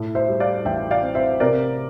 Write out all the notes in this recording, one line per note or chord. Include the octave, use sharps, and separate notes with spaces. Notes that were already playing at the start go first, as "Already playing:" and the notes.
Already playing: A2
C5 E5
G3
D5 F5
A1 E5 G5
D5 F5
C4
C5 E5
C3 A#4 D5